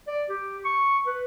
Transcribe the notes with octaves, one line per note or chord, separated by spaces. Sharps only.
D5
G4
C#6
B4